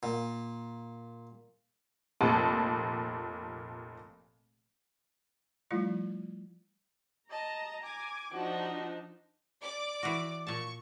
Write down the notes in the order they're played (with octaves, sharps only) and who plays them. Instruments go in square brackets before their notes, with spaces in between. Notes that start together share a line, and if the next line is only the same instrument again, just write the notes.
[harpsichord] A#2
[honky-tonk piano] F1 A#2 A5
[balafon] F3 G3 A3 E4 F4 F5
[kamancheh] D#5 A5 [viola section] A#5
[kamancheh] G#5 D6
[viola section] F3 D4 D#4 [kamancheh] F#4
[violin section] D5 D6
[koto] E3 F#4
[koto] A#2 A5 [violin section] C#6